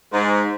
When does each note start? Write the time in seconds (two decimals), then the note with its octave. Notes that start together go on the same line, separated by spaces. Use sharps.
0.12 G#2